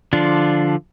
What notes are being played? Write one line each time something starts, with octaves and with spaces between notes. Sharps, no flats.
D3 F3 D4 F4